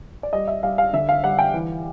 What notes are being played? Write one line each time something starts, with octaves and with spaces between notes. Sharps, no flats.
D5
G3 D#5
E5
G3 F5
F5
D3 E5
F5
G3 F#5
G5
E3